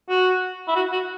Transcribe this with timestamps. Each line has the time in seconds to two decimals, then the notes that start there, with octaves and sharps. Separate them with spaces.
0.09 F#4
0.68 E4
0.76 F#4
0.93 F#4